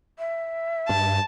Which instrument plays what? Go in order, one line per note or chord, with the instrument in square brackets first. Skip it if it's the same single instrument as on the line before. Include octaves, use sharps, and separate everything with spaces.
[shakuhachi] E5
[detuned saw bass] G2 [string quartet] A5